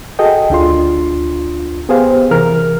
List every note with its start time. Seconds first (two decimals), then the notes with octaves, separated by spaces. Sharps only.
0.19 F#4 G#4 A4 D#5 G5
0.50 D2 D4 F4 C6
1.89 B3 G4 G#4 C5 F5
2.31 C3 E3 A#4 F6